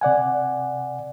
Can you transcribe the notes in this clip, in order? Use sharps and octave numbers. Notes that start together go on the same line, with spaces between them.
C3 D5 F#5 G#5